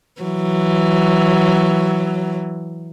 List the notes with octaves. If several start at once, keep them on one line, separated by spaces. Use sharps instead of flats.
E3 F#3